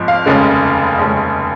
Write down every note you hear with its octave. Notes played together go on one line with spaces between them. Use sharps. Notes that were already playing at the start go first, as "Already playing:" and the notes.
Already playing: G#1 G#2 F3
F5
F1 D#2 C#3 G#3 C#4
F1 D#2 C#3 G#3 C#4